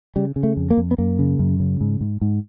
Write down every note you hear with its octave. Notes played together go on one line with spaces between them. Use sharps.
C#3 G3
C#3
A3
F2
A#3
F2
B3
F#2 A#3
C#3
F#2
C#3
G#2
G#2
G#2